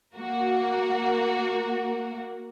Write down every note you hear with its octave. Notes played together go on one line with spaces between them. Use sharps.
A#3 F#4 A#4